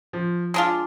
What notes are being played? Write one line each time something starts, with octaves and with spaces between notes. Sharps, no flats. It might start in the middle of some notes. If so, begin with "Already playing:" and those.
F3
G#3 D4 F4